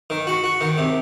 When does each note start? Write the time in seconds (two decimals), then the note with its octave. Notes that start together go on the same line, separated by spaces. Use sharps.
0.10 D#3
0.27 F#4
0.44 F#4
0.61 D#3
0.78 C3